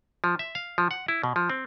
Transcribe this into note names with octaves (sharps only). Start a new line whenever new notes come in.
F3
E5
F5
F3
F#5
E4
B2
F3
C4